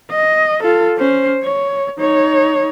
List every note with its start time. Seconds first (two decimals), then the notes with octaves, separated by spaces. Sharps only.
0.11 D#5
0.63 F4 A4
0.98 C#4 C5
1.44 C#5
1.99 D#4 C#5